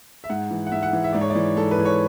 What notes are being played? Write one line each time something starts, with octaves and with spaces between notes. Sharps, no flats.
E5
G#2 F#5
E3
F#5
G#2 E5
F#5
E3
E5
G#2 D5
C#5
D5
E3
G#2 A4
B4
E3
C#5